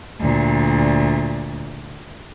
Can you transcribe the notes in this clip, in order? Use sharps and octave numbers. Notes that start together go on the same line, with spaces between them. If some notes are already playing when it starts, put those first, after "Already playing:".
D2 A#2